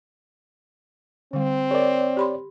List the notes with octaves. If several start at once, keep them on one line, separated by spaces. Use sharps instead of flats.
D3 G3 C4
G#4 A#4 C#5 D5
G4 B5 C6